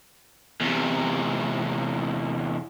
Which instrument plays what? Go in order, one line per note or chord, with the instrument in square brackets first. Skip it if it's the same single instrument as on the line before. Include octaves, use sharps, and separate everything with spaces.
[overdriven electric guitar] E2 C3